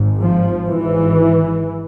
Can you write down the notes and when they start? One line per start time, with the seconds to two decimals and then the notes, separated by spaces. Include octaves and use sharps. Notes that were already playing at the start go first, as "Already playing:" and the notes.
Already playing: G#1 G#2
0.22 F3
0.68 G#1 G#2 E3